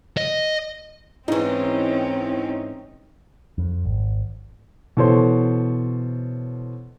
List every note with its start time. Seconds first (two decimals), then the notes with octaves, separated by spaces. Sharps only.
0.17 D#5
1.28 G#2 E3 C4 C#4 D#4
3.58 F2
3.85 G#1
4.97 B2 E3 A4 C5 C#5 C6